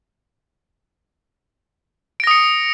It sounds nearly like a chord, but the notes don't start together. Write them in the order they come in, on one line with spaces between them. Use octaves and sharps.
D7 A#6 D#6 C#7